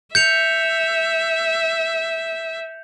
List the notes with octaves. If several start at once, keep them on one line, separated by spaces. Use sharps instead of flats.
E5 G6 C#7 F7